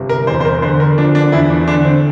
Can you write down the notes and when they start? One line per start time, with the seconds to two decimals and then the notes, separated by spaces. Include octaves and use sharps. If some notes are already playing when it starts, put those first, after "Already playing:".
Already playing: G1 C3
0.09 A#4
0.27 E2 C5
0.40 C5
0.45 A#4
0.62 D3 C5
0.80 A#4
0.97 F3 D4
1.15 D4
1.32 E2 E4
1.50 D4
1.68 D3 D4
1.85 C4